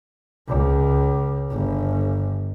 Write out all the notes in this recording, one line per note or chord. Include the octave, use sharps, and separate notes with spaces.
C#2
G1